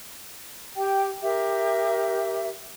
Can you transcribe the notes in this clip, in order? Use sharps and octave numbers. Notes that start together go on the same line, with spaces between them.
G4 G5
G4 A#4 E5